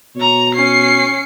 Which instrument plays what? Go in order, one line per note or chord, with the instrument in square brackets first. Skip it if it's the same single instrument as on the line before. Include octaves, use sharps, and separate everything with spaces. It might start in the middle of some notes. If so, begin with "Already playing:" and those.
[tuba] B2 [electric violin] C#5 A#5
[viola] C#4 [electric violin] C7 C#7